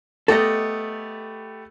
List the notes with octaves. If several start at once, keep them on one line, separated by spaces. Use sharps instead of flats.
A3 B3 G4 A4 D#5